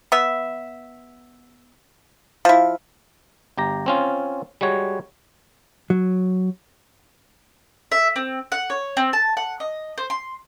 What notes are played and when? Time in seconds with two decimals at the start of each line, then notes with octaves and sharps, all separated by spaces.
0.12 B3 E5
2.45 F3 E4 F5
3.57 G1 G4 A#5
3.86 C4 C#4 F4
4.61 G3 G#3 F#4 C#5
5.90 F#3
7.92 E5
8.16 C4
8.52 F#5
8.70 C#5
8.97 C4
9.13 A5
9.37 F#5
9.60 D#5
9.98 C5
10.10 C6